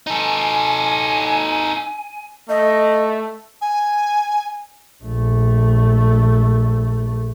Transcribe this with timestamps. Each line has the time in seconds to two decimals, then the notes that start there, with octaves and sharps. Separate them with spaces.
0.07 D#4 A4 G#5
2.49 A3 D#5
3.61 G#5
5.03 A#1 A3